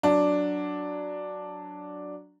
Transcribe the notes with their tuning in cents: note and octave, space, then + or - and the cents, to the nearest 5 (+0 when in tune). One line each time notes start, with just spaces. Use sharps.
F#3 +0 D4 +0